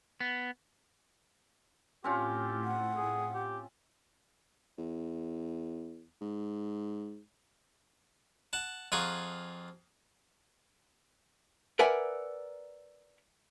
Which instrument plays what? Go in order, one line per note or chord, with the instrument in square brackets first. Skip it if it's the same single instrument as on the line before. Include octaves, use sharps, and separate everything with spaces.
[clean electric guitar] B3
[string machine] A2 [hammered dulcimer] C4 C#4 F4 [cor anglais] G4
[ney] F#5
[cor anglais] G#4
G4
[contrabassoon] E2
G#2
[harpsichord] F#5 A5
F2 F4 G#4 F#5 A#5 C#6
[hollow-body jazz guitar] A#4 B4 D5 E5 F#5 G#5